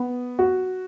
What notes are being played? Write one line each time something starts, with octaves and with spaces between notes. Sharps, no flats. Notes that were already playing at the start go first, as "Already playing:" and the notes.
Already playing: B3
F#4